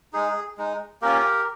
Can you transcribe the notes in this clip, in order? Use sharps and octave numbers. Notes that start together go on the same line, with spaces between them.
G#3 D#4 G#4
G#3 D#4
A#3 C#4 F4 G4 A#4